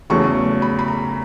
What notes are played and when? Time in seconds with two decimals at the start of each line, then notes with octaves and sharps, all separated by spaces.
0.10 E2 C#3 F#3 A3 C#6
0.62 B5
0.79 B5
0.88 A#5